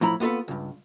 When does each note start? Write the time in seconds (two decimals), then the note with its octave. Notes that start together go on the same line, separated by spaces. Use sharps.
0.01 A2 F3 E4 A#5 B5
0.20 A#3 B3 F4 A4 B4
0.48 C#2 G2